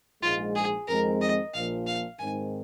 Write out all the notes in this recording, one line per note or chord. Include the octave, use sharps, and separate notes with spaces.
A#1 G#2 G#3 F4
G#4
F2 D#3 G#3 C4 A#4
D#5
A#1 A#2 F3 A#3 F5
F5
G#2 D#3 G#3 C4 G#5